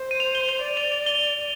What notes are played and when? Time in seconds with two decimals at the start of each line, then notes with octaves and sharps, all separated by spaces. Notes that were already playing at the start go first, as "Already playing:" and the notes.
Already playing: C5
0.11 D#7
0.20 F7
0.35 G7
0.49 F7
0.63 D5
0.77 F7
0.92 F7
1.06 G7